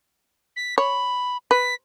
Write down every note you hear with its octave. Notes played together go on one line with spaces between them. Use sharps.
B6
C#5 B5
B4 B6